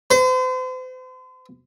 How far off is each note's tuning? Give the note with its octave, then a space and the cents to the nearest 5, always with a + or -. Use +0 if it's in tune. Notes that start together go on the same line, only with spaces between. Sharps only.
C5 -40